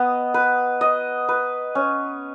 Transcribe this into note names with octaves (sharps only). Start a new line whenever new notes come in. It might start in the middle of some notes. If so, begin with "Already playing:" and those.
Already playing: B3 D#5
B4
D#5
B4
C#4